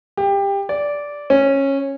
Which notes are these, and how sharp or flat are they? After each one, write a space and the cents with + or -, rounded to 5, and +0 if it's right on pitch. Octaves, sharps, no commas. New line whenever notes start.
G4 +20
D5 -10
C#4 -15